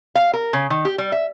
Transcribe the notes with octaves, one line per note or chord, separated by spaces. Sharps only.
F5
A#4
C#3
D#3
G4
G3
E5